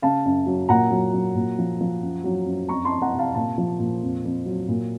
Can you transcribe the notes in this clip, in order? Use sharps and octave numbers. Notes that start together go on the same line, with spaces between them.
C#3 F5 A5
F#2
F#3
A#2 F#5 A#5
F#3
F#3
A#2
F3
F3
F#2
F#3
F#2
F2 A#5 C#6
A5 C6
F2
F#5 A#5
C3
F5 A5
A#2 F5 A5
F3
A#2
F2
F2
F#3
A#2